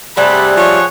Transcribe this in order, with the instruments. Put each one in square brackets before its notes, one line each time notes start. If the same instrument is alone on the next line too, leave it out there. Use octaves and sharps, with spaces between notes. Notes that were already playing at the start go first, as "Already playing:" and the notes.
[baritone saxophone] C3 [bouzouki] G3 A3 D4 [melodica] G#4 F#5 [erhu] B5
[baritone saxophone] F3 [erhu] C#5